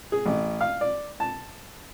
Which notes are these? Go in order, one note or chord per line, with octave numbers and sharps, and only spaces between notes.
G#4
A1
F5
D5
A5